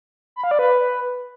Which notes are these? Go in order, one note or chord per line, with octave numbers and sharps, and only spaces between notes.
B5
F5
D5
B4